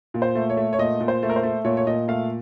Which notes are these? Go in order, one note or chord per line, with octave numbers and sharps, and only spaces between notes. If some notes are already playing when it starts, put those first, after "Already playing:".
A#2
C5
A3
C#5
A3
C#5
A#2 D#5
A#2
C5
A3
A#4
C5
A3
A#2 C#5
C#5
A#2 D#5
A3 F5